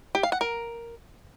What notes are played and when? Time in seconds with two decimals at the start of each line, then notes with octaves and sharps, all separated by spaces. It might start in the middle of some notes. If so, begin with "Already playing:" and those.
0.15 G4
0.23 F5
0.32 F#5
0.41 A#4